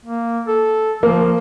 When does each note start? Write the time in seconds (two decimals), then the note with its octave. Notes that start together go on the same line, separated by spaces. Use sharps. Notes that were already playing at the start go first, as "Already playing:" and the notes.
0.05 A#3
0.48 A4
1.03 F3 A#3